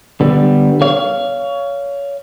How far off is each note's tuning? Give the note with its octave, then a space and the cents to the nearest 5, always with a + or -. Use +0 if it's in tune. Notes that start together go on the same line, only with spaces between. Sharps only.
D3 +15 G3 +0 B3 +0
C#5 +25 F5 -10